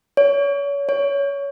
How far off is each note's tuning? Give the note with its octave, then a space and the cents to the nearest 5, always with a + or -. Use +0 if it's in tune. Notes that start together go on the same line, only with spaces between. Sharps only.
C#5 +30
C#5 +20